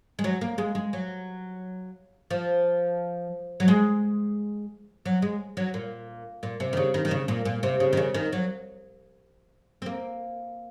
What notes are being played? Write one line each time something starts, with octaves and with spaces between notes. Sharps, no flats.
G#3
F#3
A#3
G#3
G#3
F#3
F3
F#3
G#3
F#3
G#3
F#3
A#2
A#2
C3
D#3
C#3
D#3
D#3
C#3
A#2
A#2
C3
C#3
D#3
C#3
D#3
F#3
C4
A#3